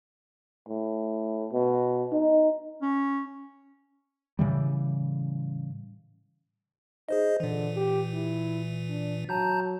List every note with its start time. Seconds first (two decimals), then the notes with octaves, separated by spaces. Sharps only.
0.68 A2
1.52 B2
2.12 D#4
2.82 C#4
4.39 A2 C#3 E3 G3
7.09 D#4 G#4 C5 D#5
7.40 A#2 D3 E3
7.76 G4
8.14 E4
8.89 D4
9.29 F#3 A5 A#5 G6